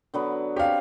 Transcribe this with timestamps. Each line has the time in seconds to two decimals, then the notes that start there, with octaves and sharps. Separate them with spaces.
0.14 D3 F#3 B3
0.56 C4 D4 G4 C#5 F5